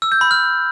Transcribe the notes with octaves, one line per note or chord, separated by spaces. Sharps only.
E6
G6
B5
F6